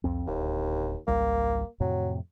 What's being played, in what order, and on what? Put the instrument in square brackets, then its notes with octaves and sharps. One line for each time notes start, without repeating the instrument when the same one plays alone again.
[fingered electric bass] C2 F2 C4
[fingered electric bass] D1 [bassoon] D#2
[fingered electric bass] G#1 C#2 G3 [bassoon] A#3
[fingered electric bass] F2 A2 C3 [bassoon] F#3